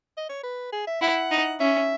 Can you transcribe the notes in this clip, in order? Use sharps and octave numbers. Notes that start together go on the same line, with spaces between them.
D#5
C#5
B4
G#4
E5
E4 F#5
D#4
C#4 E5